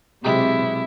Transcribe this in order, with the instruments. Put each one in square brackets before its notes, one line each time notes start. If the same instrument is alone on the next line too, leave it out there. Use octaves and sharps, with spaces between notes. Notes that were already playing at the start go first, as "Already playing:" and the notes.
[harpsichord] B1 G#3 G4 [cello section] C3 [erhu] E4